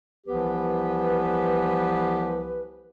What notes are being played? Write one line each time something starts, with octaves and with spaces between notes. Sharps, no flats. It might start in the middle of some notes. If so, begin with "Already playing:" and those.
C2 E3 F3 B3 G4 B4